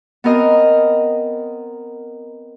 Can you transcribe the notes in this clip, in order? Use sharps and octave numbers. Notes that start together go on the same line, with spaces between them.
B3 C4 A#4 D#5